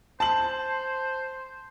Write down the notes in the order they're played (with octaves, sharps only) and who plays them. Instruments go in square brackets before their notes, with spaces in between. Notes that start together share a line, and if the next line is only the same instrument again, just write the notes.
[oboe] C5 [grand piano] A5 F#7